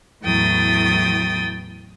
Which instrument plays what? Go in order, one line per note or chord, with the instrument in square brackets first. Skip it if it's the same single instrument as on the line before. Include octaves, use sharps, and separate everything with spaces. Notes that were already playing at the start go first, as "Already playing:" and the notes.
[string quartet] E2 A2 F#3 G5 D#6 A6